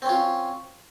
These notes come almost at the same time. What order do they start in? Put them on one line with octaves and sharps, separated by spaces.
C4 C#4 F4